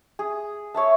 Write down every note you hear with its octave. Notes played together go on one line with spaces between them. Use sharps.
G#4
C#5 E5 A5